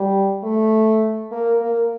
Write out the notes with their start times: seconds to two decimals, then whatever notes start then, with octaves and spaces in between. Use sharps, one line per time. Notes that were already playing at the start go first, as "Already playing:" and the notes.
Already playing: G3
0.43 A3
1.32 A#3
1.61 A#3